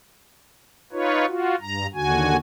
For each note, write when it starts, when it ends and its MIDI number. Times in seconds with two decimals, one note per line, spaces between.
0.92 1.26 63
0.92 1.26 65
0.92 1.26 71
0.92 1.26 73
1.27 1.55 65
1.27 1.55 66
1.61 1.87 43
1.61 1.87 82
1.94 2.37 39
1.94 2.37 50
1.94 2.37 66
1.94 2.37 80